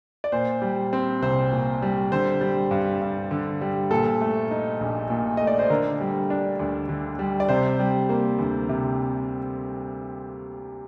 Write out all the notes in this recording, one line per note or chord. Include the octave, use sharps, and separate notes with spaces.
D5
A#2 C5
G3
C4
C2 C5
A#2
G3
D3 C5
G3
G2
G2
D3
G3
A#2 A4
A3
D#4
A#1
A#2
A3 D#5
D5
C5
D3 A#4
G3
D4
D2
D3
G3
D5
C3 C5
G3
A#3
D2
C3